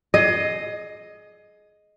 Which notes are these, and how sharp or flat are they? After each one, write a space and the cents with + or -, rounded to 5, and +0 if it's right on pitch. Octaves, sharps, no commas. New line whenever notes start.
G#4 +25 D#5 +0